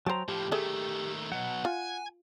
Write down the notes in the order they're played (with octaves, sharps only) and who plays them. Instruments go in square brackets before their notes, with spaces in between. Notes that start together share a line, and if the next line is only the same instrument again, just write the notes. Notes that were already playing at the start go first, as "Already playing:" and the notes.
[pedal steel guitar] F#3 G5 A#5 [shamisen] C5 A5
[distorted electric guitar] A2 F3 [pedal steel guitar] G4
[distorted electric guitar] D#3 A3 [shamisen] G#4 A4 E5
[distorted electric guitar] B2 F#3 [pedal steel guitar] F#5
[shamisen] F4 [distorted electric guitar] G#5